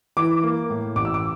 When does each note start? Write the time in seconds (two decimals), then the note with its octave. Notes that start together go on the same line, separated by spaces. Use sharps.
0.17 E3 D6
0.43 A#3
0.70 A2
0.96 A1 D6
1.05 E6
1.14 D6